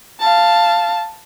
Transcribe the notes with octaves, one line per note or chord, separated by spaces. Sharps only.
F5 A5